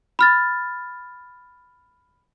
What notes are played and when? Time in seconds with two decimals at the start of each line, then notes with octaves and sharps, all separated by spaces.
0.19 B5 F6 A6